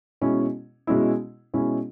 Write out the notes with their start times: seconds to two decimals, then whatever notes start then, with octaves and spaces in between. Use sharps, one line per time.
0.21 B2 G#3 C#4 E4
0.87 B2 G#3 C#4 E4
1.54 B2 G#3 C#4 E4